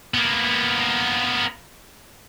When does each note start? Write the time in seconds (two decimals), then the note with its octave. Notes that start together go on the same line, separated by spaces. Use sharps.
0.14 A#3 B3